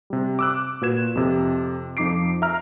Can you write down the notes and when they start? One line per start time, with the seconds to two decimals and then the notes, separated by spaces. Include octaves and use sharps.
0.10 C3 G3
0.39 D6 E6 F#6
0.81 A#2 F#4 B4 G#6 E7
1.15 F2 C3
1.97 F2 F3 D#4 D6 C7 D7
2.42 E5 A#5 F6